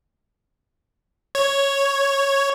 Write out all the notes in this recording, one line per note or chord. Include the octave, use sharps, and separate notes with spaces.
C#5